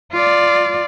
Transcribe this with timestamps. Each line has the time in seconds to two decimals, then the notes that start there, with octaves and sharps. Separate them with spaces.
0.13 F4 D5